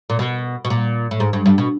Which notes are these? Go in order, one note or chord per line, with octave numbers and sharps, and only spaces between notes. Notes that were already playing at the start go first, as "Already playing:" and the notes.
A#2
B2
B2
A#2
A2
G#2
G2
G2
B2